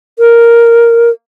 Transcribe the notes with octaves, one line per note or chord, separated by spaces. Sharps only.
A#4